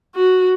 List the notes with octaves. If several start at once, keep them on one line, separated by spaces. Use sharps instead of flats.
F#4